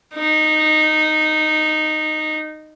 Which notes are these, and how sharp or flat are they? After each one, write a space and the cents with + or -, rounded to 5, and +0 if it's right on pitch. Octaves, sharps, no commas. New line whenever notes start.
D#4 -10